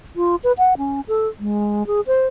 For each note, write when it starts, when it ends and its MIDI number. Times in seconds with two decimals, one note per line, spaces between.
0.16 0.36 65
0.44 0.52 71
0.58 0.77 78
0.77 1.01 61
1.08 1.28 69
1.39 1.86 56
1.87 2.01 68
2.07 2.27 72